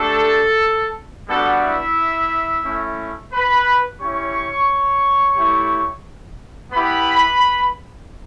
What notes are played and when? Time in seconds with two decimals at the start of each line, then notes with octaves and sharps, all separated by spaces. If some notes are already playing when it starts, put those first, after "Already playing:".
Already playing: A3 D4 G4 A4
1.28 G3 B3 D4 F#4 A4
1.62 E4 E5
2.65 A3 C#4 E4
3.33 B4 B5
4.00 C#4 E4 G4 C#5 C#6
5.37 A3 E4 G4
6.72 B3 E4 G4 B4 B5